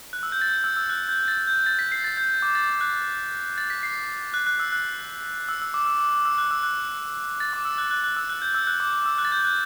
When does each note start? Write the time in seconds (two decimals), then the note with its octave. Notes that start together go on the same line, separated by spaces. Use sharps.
0.13 F#6
0.23 E6
0.32 G6
0.42 A6
0.52 G6
0.64 E6
0.77 E6
0.90 F#6
1.09 G6
1.28 A6
1.47 G6
1.66 A6
1.79 B6
1.92 C7
2.04 A6
2.17 G6
2.42 D6
2.55 A6
2.81 F#6
3.58 A6
3.70 B6
3.83 C7
4.34 F#6
4.47 F#6
4.60 E6
4.72 F#6
5.49 E6
5.62 E6
5.74 D6
5.86 E6
6.00 D6
6.13 D6
6.25 E6
6.38 F#6
6.51 E6
6.63 F#6
7.40 A6
7.53 D6
7.65 E6
7.78 F#6
7.91 F#6
8.04 F#6
8.17 E6
8.30 F#6
8.42 G6
8.55 E6
8.67 F#6
8.80 D6
8.93 D6
9.06 E6
9.18 F#6
9.25 A6
9.32 G6
9.45 F#6